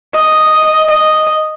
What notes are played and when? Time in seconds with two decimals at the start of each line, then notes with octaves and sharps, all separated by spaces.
0.15 D#5
0.90 D#5